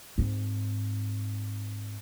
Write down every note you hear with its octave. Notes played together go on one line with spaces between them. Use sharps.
G#2 C4